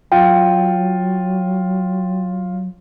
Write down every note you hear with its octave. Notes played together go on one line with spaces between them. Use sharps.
F#3 F4 G5